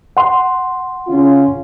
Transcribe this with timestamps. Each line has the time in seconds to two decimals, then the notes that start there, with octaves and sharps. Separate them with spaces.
0.17 F#5 C6
1.08 C#3 C#4 F4